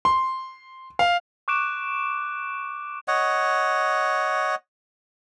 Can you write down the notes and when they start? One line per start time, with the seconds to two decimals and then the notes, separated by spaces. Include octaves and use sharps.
0.05 C6
0.99 F5
1.48 C#6 D6 F#6 D7 E7
3.08 C#5 D#5 F#5